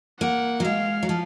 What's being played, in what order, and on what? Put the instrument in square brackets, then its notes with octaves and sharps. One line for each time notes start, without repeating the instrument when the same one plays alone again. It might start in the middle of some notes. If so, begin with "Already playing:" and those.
[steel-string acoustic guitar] A#3 [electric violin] F#5
[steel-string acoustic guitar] F#3
[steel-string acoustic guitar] G#3 [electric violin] F5
[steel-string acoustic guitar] F#3
F3